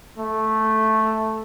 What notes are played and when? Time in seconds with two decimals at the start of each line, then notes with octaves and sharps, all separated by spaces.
0.18 A3